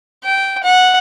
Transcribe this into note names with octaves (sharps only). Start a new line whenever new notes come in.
G5
F#5